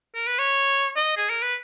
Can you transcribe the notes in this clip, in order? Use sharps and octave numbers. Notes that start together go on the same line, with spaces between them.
A#4
B4
C#5
D#5
G#4
A#4
B4